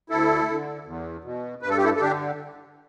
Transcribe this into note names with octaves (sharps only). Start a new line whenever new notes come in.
D2 E4 A4
D3
E2
B2
G2 B4
A4
G4
E4 A4
A4
D3 D4 G4